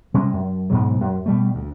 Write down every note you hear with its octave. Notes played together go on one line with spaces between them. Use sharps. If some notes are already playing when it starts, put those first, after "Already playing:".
C3 G3 G#3 C#4
F#2
D2 G#2 B2 F#3
F#2
B2 G3 A3
D2